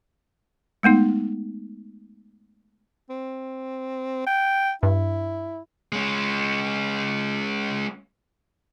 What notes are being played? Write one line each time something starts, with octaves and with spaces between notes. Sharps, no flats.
G#3 A3 B3 D#4
C4
G5
G2 E4
G#3 C#4